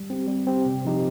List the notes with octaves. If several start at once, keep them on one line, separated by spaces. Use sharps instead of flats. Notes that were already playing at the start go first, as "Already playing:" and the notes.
Already playing: G3
C4 G4
G3
C4 G4
C3
F3 C4 D#4 G4